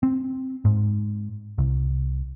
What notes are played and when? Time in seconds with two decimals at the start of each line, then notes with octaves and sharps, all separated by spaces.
0.03 C4
0.65 G#2
1.58 C2